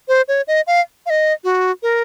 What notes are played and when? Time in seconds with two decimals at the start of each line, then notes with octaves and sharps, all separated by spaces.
0.08 C5
0.28 C#5
0.48 D#5
0.67 F5
1.06 F5
1.10 D#5
1.44 F#4
1.83 A#4